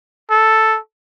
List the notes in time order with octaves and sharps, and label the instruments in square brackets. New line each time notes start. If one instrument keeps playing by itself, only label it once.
[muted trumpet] A4